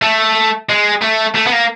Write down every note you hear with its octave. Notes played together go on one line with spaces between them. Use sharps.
A3
G#3
A3
A3
B3
A#3